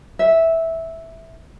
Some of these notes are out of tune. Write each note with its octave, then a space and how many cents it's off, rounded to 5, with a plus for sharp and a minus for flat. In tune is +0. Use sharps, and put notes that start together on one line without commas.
E5 -10